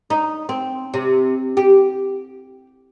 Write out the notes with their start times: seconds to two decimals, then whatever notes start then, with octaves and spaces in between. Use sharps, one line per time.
0.10 D#4
0.49 C4
0.94 C3
1.57 G4